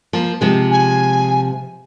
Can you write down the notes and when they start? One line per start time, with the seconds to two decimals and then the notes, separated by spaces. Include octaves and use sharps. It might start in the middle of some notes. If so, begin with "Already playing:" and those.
0.13 F3 A#3
0.41 C3 F3 G#3
0.71 G#5